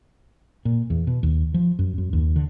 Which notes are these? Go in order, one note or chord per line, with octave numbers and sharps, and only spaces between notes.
A#2
E2
B2
D#2
F3
F#2
F#2
D#2
D3